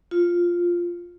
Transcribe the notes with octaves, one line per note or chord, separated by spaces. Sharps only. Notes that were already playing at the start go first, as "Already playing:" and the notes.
F4